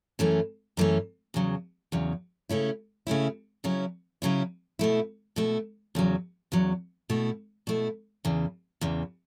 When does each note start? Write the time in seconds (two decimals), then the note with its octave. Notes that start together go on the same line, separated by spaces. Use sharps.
0.19 F#2 E3 A3 C#4
0.77 F#2 E3 A3 C#4
1.34 E2 C#3 F#3
1.92 E2 C#3 F#3
2.49 C#3 A3 C#4 E4
3.07 C#3 A3 C#4 E4
3.64 C#3 F#3 C#4 E4
4.22 C#3 F#3 C#4 E4
4.79 B2 A3 E4
5.36 B2 A3 E4
5.95 E2 C#3 F#3
6.52 E2 C#3 F#3
7.10 B2 A3 E4
7.67 B2 A3 E4
8.25 E2 C#3 E3
8.81 E2 C#3 E3